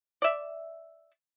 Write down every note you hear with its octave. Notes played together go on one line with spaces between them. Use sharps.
D5 E5